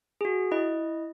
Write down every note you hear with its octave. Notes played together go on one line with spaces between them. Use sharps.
F#4 G#4
E4 D#5